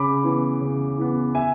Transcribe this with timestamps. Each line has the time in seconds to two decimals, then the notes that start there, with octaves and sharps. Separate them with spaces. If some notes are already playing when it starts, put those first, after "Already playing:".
Already playing: C#3 B5 D6
0.24 E3 B3
0.61 C#3
0.98 E3 B3
1.35 E5 G#5